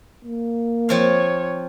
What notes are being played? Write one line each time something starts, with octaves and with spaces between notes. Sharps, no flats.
A#3
F3 C4 C#5 F5